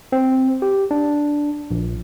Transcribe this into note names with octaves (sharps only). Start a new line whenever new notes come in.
C4
G4
D4
A#1